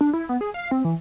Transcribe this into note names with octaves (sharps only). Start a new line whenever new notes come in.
D4
E4
B3
G#4
F5
C4
E3